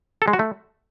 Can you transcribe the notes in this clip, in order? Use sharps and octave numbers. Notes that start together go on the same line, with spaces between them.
A4
G#3
F#4
A3